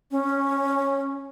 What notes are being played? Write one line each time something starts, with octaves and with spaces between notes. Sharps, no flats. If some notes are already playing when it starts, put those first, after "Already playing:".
C#4